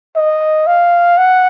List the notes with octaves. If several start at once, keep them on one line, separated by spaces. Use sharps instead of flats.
D#5
F5
F#5